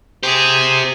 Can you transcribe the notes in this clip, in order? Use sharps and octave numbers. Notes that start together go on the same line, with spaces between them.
G4 G#4 C5